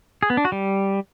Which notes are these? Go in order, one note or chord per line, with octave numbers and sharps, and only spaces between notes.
G#4
B3
D4
F#4
G3